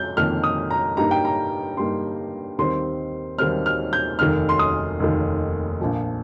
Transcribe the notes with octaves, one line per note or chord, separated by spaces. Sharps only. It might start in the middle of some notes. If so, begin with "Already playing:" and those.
Already playing: F2 G6
F2 D#3 A#3 F6
D#6
A#5
G2 G3 A#3 D#4 A#5
G5
A#5
G2 G3 A#3 D#4 C6
D#2 D#3 G3 C4 C6
D#2 D#3 G3 C4 F6
F6
G6
F1 D#2 D#3 F6
C6
D#6
F1 D#2 D#3
A#1 A#2 F3